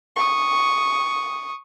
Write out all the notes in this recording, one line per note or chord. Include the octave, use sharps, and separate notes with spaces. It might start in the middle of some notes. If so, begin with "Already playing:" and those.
C#6 D#6